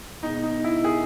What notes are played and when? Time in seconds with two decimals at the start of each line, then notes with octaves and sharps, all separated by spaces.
0.23 B2 D#4
0.25 G#3
0.43 D#4
0.64 E4
0.85 G#4